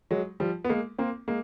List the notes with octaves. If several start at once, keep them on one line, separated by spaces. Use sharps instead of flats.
F#3 G#3
F3 G3
B3
G#3 A#3
A#3 C4
G#3 A#3